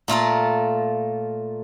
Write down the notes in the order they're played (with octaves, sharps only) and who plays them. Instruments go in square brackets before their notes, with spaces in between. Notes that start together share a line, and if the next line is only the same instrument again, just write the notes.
[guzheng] A#2 A3 F4 A#4